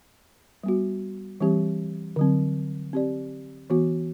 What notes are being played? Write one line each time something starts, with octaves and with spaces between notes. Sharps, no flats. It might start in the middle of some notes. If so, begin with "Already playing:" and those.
G3 B3 F#4
E3 G3 C4 G4
D3 F#3 C4
C4 G4 D5
E3 B3 F#4